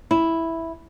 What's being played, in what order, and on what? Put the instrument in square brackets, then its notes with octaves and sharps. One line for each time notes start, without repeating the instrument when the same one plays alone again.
[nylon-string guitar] E4